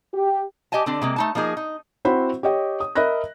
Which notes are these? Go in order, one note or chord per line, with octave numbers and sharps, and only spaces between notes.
G4
G4 D#5 E5 G#5 A5
D3 C4 D4
C3 G#3 A#3
A3 D#4 A5
F3 A#3 D#4 G#4
D#4
C4 E4 F#4 C5 F#5 B5
G4 C#5 D#5 G5
D#6
A#4 D#5 E5 B5 F#6 A#6